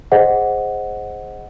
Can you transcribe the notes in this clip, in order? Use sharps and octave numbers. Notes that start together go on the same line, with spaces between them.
G#4 C5 D#5 F#5